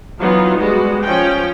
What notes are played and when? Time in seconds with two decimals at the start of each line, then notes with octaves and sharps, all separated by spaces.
0.20 E3 F#3 B3 D#4 F4
0.59 G3 G#3 B3 F#4
1.03 F3 C#4 G5